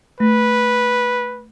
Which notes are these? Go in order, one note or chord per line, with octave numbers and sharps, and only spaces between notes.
A3 B4